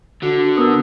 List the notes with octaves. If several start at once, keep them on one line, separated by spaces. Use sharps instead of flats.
D3 F#4
B3 A#4 D#6 E6